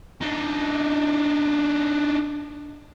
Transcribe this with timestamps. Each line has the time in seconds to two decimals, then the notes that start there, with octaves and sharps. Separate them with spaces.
0.21 D4 D#4